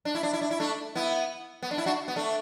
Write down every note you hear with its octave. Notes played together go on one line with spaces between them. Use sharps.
D4
E4
D4
E4
D4
E4
A3 D4
B3 E4
B3
D4
E4
D4 F#4
B3
A3 D4